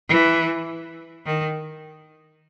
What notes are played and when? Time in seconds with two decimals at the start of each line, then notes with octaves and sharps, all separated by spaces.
0.09 E3
1.26 D#3